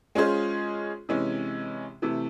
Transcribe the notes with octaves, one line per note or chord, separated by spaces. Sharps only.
G#3 C#4 F4 G#4 C5
C3 E3 G#3 C#4
C3 E3 A3